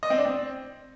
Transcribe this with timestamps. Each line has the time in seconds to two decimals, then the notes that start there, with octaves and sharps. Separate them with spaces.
0.03 D#5
0.10 C4
0.18 D4
0.25 C4